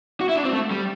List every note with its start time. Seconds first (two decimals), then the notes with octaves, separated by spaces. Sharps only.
0.21 F#4
0.29 E4
0.36 D4
0.45 C4
0.53 A3
0.71 G3